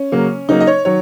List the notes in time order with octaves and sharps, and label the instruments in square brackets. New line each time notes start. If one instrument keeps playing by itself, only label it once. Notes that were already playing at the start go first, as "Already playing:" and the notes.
Already playing: [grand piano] C#4
C#3 F#3 A#3
C#3 F#3 A#3 D#4
D#5
C#5
D#3 F#3 C#5